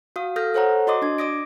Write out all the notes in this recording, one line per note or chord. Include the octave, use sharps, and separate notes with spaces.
F#4 F5 D#6
A4 D#6 F6 G6 A#6
A4 C5 C#5 F#5 A#5
F#4 D5 D#5 C6 D6 D#6
D4 G#6
D5 D6 D#6 A#6 D7